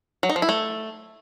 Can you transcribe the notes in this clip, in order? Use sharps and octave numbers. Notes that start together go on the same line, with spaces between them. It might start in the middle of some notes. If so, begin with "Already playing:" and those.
F#3
D#4
F3
E4
A3